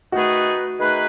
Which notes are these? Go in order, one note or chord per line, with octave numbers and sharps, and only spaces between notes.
D#3 A3 D#4 F#4 G#4 B4
D#3 A3 D#4 G#4 B4